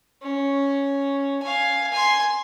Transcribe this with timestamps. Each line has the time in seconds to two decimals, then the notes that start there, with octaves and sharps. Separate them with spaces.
0.22 C#4
1.43 F5 G#5
1.92 G#5 C6